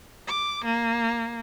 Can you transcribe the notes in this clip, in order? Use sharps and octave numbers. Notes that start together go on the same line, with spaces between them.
D6
A#3